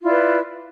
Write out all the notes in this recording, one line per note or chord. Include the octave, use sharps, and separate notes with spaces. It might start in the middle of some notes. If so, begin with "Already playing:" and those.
E4 F4 B4 D5